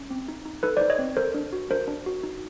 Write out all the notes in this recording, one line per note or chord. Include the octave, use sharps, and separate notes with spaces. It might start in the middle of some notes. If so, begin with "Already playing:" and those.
Already playing: C#4
C4
D#4
D#4
D#4 A4 B4
D#4 C5 D5
C#5 D#5
C4
A4 A#4 C5
D4
F#4
D4 A#4 C5
D4
F#4
D#4